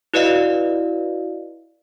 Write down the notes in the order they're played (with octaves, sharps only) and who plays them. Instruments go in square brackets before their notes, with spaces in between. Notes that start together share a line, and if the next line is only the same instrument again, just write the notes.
[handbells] E4 F#4 B4 D5 D#5 F5